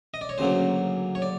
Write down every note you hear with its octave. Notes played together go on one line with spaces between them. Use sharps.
D#5
D5
C#5
D2 C#3 F#3 A#3 C5
C#5
D5